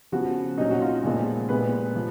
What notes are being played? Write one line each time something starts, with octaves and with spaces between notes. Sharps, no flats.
C#3 F3 B3 F#4
A#2 F#3 C#4 D#4
F#4
F4
A#2 F3 G#3 B3
A#2 G#3 B3 B4
F3